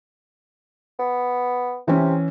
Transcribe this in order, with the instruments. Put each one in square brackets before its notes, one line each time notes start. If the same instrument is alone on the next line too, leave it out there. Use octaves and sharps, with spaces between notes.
[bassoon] B3
[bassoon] C3 [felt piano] E3 C#4